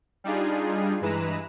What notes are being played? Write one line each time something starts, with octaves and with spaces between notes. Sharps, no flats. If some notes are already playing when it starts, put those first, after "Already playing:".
G3 D4 D#4 F4 G#4
G2 E3 G#3 B4 A#5 E7